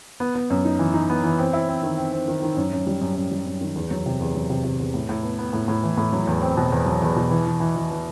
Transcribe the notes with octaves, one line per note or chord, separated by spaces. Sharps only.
B3
B3
F#2
D#4
E3
D#4
B3
E3
C4
E4
C4
D#3
C4
C4
D#3
D#3
F#2
F#2
G3
F#2
F#2
G3
F#2
D#3
E2
F#3
C3
E2
F#3
C3
C3
E2
A2
A2
B3
B3
A2
A2
E3
A2
F#3
E2
C4
B2
E2
F#3
E2
B2
E3
E3
E3
E3
E3